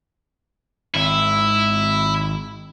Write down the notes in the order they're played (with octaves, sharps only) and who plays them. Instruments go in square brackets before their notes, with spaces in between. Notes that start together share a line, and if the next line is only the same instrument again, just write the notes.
[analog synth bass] G#1 [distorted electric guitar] E4